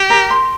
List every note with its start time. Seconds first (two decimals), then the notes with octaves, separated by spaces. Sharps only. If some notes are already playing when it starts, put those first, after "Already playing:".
Already playing: G4
0.10 A#4
0.31 C6